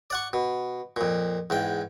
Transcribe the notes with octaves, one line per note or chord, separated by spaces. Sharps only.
D5 F#5 C#6
B2
F2 A#2
E2 G#2 G5